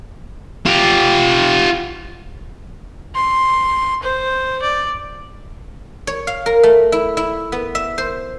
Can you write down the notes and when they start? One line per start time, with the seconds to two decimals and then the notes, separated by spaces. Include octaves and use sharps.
0.66 F4 G4
3.15 C6
4.03 C5
4.62 D5
6.07 C#5
6.27 F5
6.46 A#4
6.63 A3
6.92 E4
7.17 E4
7.52 B3
7.75 E5
7.98 C5